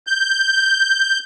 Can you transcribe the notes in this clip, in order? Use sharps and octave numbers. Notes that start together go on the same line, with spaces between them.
G6